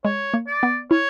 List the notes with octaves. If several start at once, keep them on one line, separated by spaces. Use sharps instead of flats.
G#3 C#5
A#3
D5
B3
E4 C#5